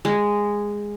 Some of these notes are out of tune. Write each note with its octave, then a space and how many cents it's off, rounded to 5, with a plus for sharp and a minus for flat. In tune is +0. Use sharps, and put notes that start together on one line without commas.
G#3 -10